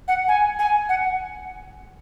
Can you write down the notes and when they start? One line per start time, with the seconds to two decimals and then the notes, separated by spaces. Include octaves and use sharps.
0.08 F#5
0.28 G#5
0.59 G#5
0.89 F#5